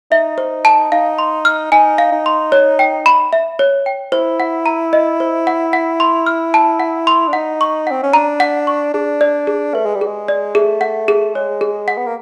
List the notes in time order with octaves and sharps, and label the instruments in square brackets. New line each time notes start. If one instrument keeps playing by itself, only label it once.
[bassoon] D#4 [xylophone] E5
[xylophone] C5
A5
[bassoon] D#4 [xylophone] F5
[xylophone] C6
F6
[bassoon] D#4 [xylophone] G#5
[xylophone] F5
[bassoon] D#4
[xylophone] C6
C#5
G5
B5
E5
C#5
G5
[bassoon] E4 [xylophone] C5
[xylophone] F#5
A#5
D#5
C5
F#5
F#5
C6
F6
A5
F#5
C6
[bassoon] D4
[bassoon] D#4 [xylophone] F#5
[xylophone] C#6
[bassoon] C4 [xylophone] F#5
[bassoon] C#4
[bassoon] D4 [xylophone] A#5
[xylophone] F#5
C#6
[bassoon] D4 [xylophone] G#4
[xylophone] D5
G#4
[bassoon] A3 [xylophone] B4
[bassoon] G#3
G3
[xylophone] G#4
[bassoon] G#3
[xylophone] D5
[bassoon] A3 [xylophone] G#4
[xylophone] F#5
G#4
[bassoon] G#3 [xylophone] C#5
[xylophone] G#4
F#5
[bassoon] B3
A#3